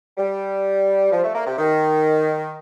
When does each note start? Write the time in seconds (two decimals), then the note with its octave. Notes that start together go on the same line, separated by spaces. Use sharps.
0.18 G3
1.12 F3
1.23 A3
1.35 A#3
1.46 C3
1.58 D#3